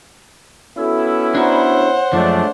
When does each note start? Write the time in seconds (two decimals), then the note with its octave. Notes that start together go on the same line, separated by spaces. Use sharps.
0.77 B3 C#4 E4 F#4 A4 E6
1.35 D4 F#4 C5 D5 F#5 A#5 B5
1.66 C#5
2.13 F#2 F3 G#3 A3 D4